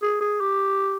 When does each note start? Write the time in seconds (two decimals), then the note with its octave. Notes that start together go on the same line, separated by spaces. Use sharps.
0.02 G#4
0.21 G#4
0.40 G4